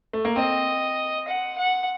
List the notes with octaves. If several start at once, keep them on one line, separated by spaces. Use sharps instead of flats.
A3
A#3
C4 D#5
F#5
F#5